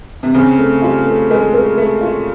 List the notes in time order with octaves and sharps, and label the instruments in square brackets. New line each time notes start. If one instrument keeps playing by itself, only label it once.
[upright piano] C3
[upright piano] C#3 [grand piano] C4
[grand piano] A3
[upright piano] G3 [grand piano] F4
[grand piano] A3
[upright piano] G#3 [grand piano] A#4
[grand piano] A#4
[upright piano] A3 [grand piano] A#4
[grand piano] F4